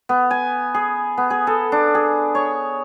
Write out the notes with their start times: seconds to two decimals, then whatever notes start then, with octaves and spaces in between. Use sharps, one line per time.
0.09 B3
0.31 G#5
0.74 G#4
1.18 B3
1.30 G#4
1.47 A4
1.72 D4
1.95 G#4
2.35 C#5